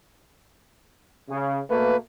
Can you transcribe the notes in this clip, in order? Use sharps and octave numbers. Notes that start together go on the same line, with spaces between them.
C#3
B2 A3 A#3 B4